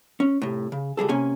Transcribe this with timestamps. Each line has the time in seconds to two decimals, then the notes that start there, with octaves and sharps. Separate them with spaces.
0.20 C#4
0.42 A2 C3
0.72 C#3
0.97 C#2 G3 G#4 A4
1.09 C3 A#3 C#4 G#5